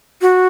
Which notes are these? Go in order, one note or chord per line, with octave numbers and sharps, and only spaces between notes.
F#4